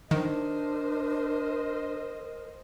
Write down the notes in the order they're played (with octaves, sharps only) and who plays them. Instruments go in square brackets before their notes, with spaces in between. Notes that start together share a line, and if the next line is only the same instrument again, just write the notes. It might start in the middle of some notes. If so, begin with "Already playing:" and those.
[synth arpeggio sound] D#3 [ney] D4 [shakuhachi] A#4 [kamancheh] C5 D#5